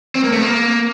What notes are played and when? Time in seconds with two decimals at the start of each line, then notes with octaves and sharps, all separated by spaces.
0.15 C4
0.24 A#3
0.32 A3
0.41 A#3